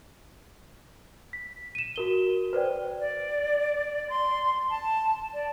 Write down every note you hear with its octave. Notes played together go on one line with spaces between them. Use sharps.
B6
D#7 E7
F#4 A#4 G7
B4 C5 D5 G5
D5
C6
A5
D5